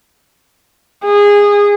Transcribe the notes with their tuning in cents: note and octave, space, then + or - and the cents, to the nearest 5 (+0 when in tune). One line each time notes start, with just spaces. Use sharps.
G#4 -20